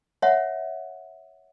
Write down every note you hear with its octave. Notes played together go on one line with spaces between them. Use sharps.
C#5 E5 F#5